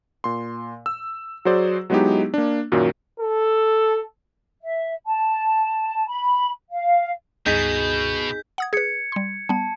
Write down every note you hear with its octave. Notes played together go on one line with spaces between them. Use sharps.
A#2 C6
E6
F#3 F#4 G#4 C5 D5
F#3 G#3 B3 D#4 E4 G4
A#3 D4
F#2 A#2 D#3 F#3
A4
E5
A5
B5
F5
C#2 G2 B2 D#4 G#4 G6 B6
F#5 D#6 G#6
G#4 B4 G#6 C#7
G3 C6
G3 B3 A5